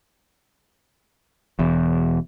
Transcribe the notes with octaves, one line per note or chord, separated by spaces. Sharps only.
E1 E2